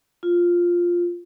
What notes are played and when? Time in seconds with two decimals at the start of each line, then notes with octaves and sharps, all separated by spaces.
0.23 F4